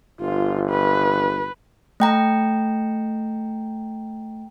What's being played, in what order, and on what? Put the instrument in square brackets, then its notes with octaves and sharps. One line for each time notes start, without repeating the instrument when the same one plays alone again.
[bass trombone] G1 [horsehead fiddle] F4
[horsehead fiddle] B4
[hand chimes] A3 G5 A#5